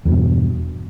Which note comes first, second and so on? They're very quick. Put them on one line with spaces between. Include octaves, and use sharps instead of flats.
E2 G2 B2